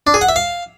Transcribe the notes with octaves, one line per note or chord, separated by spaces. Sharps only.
D4
G#4
F#5
E5
F5